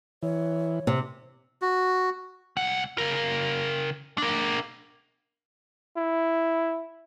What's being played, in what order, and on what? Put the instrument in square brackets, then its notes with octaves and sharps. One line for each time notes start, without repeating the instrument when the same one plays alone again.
[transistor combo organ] E3 [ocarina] C#5
[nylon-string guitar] C3
[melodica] F#4
[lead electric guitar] C2 F#5
C#3 A#4
D4 A#4
[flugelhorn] E4